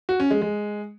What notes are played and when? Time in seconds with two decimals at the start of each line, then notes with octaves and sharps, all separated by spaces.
0.09 F#4
0.20 C#4
0.31 G#3
0.42 G#3